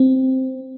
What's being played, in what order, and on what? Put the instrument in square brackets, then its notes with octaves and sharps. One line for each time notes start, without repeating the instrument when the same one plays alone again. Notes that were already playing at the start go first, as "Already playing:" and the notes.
Already playing: [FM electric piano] C4